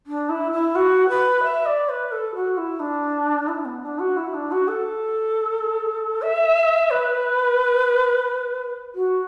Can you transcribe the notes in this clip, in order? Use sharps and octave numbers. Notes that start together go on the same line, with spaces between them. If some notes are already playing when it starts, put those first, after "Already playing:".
D4
E4
E4
F#4
B4
E5
D5
B4
A4
F#4
E4
D4
E4
D4
B3
D4
F#4
E4
D4
F#4
A4
E5
B4
F#4